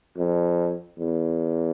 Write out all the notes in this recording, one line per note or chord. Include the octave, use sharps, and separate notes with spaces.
F2
E2